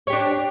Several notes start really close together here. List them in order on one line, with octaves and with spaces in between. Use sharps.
C#5 G4 D4